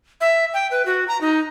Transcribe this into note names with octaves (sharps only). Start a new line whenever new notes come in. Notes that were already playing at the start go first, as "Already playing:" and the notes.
E5
G5
B4
F#4
A#5
D#4